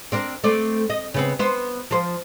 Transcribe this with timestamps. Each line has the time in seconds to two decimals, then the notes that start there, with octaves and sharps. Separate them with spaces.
0.12 C4 D4 A#4
0.44 A3 C4 D5
0.90 D#5
1.14 C#3 B3 C4
1.39 B3 C5
1.91 F3 C5